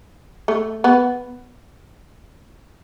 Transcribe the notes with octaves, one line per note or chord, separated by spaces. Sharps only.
A3
B3